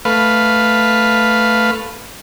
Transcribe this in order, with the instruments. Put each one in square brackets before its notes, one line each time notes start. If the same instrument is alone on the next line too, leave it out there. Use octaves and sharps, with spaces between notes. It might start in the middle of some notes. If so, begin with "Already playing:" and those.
[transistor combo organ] A3 B4 F5